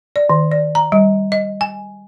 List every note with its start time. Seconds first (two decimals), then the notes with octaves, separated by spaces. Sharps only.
0.16 D5
0.29 D#3
0.52 D5
0.75 A#5
0.92 G3
1.32 D#5
1.61 G#5